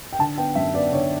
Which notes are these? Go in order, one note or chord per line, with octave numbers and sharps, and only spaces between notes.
G5
D3 A5
B3 G5
F#2 E5
B3 D5
D3 C#5